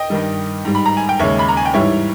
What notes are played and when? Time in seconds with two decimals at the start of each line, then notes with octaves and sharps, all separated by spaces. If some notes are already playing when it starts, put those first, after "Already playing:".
Already playing: D#5 G5
0.10 G2 D#3 G3
0.65 G#2 G3
0.75 B5
0.86 A#5
0.97 G#5
1.09 G5
1.19 D#2 C#3 G#3 C#5 E5
1.39 B5
1.48 A#5
1.57 G#5
1.65 G5
1.74 G#2 E3 G3 C#5 E5